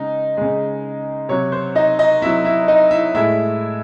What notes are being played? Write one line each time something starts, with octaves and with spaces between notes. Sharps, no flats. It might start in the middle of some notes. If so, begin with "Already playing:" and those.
Already playing: C#3 G#3 D#4
C#3 G#3
C3 F#3 C#5
C5
D#4 D#5
D#4 D#5
C3 F#3 E4 E5
E4 E5
D#4 D#5
E4 E5
A2 G#3 E4 E5